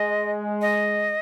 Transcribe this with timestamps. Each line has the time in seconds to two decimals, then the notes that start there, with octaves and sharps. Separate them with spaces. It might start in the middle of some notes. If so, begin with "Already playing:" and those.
Already playing: G#3 D#5
0.62 D#5